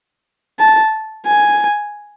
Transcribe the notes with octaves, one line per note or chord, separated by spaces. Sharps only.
A5
G#5